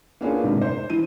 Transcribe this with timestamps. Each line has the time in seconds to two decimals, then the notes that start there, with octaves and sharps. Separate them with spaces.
0.21 A#3 B3 C#4 D4 F4 G#4
0.43 G#2 C3 D#3 G3 D4
0.62 C5
0.90 E3 D#7